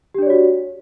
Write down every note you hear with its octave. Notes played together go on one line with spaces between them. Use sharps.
D4 F#4 G4 C#5 D5